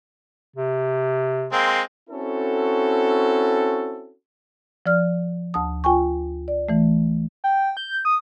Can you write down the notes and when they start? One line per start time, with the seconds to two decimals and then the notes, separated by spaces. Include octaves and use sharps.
0.56 C3
1.52 G#3 A#3 C4
2.10 C4 C#4 E4 F#4 A4
4.86 F3 D5 F6
5.54 D2 A5 D#6
5.84 F4 G5 G#5 C#6
6.48 D5
6.69 E3 A3
7.44 G5
7.77 G6
8.05 D#6